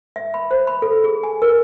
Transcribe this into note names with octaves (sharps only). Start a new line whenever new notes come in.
E5
B5
C5
B5
A4
G#4
G#5
A#4